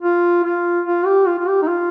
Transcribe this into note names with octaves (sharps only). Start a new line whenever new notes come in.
F4
F4
F4
G4
F4
F4
G4
D#4
F4